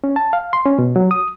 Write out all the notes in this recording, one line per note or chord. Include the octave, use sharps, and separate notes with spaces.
C#4
A5
F5
C6
C#4
B2
F#3
D#6